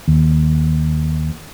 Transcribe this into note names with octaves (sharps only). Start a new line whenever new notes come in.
D#2